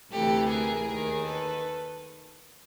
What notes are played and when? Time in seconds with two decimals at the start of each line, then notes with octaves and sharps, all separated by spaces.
0.10 D2 C3 E3 G4 A4
0.49 G#4 A#4
0.88 D#2 D#3 G#4 A#4
1.26 A4 B4